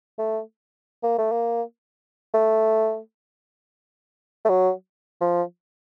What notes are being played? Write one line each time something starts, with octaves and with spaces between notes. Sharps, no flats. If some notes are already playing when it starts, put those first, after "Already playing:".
A3
A#3
A3
A#3
A3
A3
F#3
F3